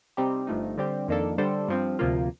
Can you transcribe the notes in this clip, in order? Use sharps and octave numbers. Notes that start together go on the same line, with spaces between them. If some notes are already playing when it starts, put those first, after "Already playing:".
C3 G3 C4 D#4 G4
G1 G2 F3 A3 D#4
D3 G3 C4 G4
F2 D#3 A#3 D4 A4
D3 G3 D4 A4 C5
G2 F3 C4
D2 C3 F3 A#3 F4